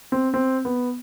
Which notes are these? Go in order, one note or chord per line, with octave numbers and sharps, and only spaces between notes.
C4
C4
B3